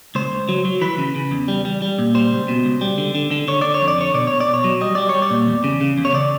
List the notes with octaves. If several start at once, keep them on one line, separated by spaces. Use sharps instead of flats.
C#2 C5
C#2
F#3
F#3
E3 B4
C#3
C#3
E2
G3
G3
G3
A#2
G3 C5
C#2
B2
C#2
G3
D3
D3
D3
D3 C#5
D3 D5
C#5
F2
D5
D3 C#5
B2 D5
B2 C#5
D5
B2
C#5
F#3
G3 D#5
G3 D5
G3 C#5
D5
A#2
E2
C#3
C#3
E2
C#5
C#3 D5